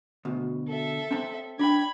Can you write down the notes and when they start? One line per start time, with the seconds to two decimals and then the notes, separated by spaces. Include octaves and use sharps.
0.25 D2 B2
0.68 A4 E5
1.11 C4 A5
1.59 D4 G5 B5 G#6